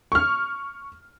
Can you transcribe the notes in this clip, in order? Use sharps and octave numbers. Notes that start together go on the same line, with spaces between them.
C#6 F6